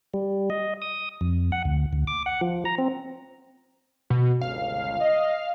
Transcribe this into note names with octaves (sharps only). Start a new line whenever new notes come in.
G3
D#5
D#6
F2
F#5
D2
D2
D6
F#5
F3
A#5
C4
B2
G1 C#2 F5
D#5